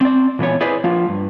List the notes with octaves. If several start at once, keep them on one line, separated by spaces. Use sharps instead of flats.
C4 D5
A#2 E3 B3 C#5
E4 G#4 B4 C5 D5
F3 A#3 F4
G2